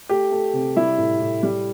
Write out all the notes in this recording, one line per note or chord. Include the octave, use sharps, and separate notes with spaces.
A3 G4
A3
C3
G3 E4
A2
A2
G3